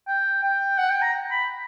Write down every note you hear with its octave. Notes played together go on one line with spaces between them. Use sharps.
G5
G5
F#5
G5
A#5
B5